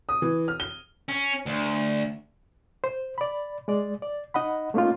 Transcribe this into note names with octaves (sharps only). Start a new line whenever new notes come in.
D#6
E3
F6
G7
C#4
D2
C5
D5 B5
G#3 D5
D5
D#4 D#5 F#5 B5
A3 A#3 C#4 D#4 F4